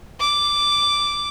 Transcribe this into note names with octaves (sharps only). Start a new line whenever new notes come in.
D6